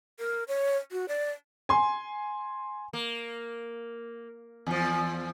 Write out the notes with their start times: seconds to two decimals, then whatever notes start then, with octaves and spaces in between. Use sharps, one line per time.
0.19 A#4
0.48 C#5
0.92 F#4
1.08 D5
1.69 G#5 C6
2.93 A#3
4.67 E2 F3